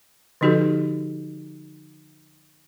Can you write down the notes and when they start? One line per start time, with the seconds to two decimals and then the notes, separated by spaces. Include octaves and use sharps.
0.41 D3 F3 D#4 F#4 G4 A4